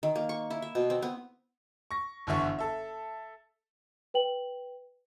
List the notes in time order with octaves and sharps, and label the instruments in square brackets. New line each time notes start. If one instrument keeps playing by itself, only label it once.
[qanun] D#3
A#3
C#6
E4
E5
B2
C4
B3
[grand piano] C#6 A#6
G1 D3 E3 E5 C#6
A4 E5
[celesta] B4 G5 F#7